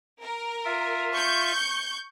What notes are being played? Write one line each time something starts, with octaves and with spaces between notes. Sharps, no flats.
A#4
F4 E5
C#6 G6